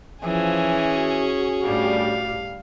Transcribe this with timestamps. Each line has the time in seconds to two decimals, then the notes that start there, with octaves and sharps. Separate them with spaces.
0.24 E3 F3 C#4 G#4
0.93 F#4
1.64 A2 G3 D4 F5